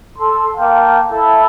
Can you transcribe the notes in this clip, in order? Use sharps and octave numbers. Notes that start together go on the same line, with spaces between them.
A4 C6
A#3 F5 G5 A5
E4 A4